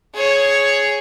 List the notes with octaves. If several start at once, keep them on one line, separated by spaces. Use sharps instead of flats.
G#4 C#5